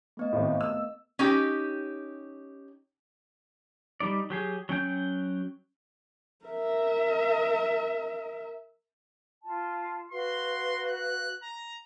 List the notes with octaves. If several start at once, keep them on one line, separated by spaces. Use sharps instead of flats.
A3 B3 D#5
G#1 A2
E6
C#4 D#4 G4
G3 D#4 D5
F#3 G4 G#4
F#3 C#4 G5 G6
A#4 E5
F4 A5
F#4 B4 F5 C6
F#6
A#5